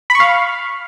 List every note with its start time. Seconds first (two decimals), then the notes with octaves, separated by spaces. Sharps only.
0.10 B5
0.15 C#6
0.20 F5